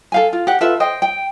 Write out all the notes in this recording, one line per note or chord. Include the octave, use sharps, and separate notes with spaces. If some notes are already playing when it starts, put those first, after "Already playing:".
A4 F5 G#5
F4
G4 F#5
F4 A4 B4 E5
C5 D#5 G5
G5